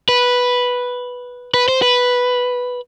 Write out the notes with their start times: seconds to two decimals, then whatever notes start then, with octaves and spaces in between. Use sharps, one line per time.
0.09 B4
1.54 B4
1.68 C5
1.82 B4